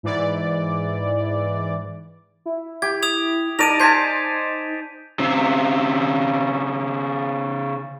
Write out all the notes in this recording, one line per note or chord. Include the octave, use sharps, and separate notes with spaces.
G#2 E3 D5
E4
G4 G#6
D#6 G#6 F7
D#4 A#4 D5 A5 D7 D#7 F7
C5 G#5 A5 G6 B6
C#3 C4